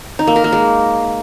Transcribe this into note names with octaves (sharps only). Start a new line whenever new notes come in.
D#4
A#3
A#4
A#3
G#3